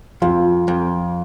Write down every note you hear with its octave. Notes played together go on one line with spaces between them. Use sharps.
F2 F4
F2